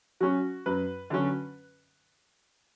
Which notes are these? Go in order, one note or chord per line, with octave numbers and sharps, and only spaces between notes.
F#3 C#4 F#4
F#2 B4
D3 F#3 C#4